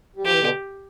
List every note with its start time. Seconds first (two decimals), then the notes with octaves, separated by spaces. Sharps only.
0.16 G3
0.24 F3 G4
0.31 E3
0.40 B2 D3